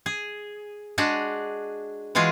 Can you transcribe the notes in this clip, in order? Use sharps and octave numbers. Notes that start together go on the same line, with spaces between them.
G#4
G#3 D4 F#4 G#4
E3 G#3 F4 F#4 G#4